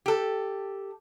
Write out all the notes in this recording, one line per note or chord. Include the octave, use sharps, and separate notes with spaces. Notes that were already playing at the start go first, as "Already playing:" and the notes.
G4 A4